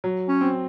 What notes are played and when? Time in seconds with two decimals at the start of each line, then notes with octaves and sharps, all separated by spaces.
0.04 F#3
0.28 C#4
0.41 C4